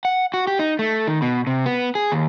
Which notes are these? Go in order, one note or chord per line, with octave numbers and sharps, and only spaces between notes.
F#5
F#4
G4
D#4
A3
D#3
B2
C3
B3
G#4
D#2